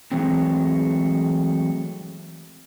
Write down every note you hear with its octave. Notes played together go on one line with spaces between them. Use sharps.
E3 F#3 G#3 A3 C4